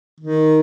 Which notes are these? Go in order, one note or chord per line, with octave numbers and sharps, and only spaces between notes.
D#3